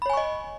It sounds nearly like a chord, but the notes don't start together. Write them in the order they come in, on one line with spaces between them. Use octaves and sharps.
B5 C#5 G#5 C#6 D#5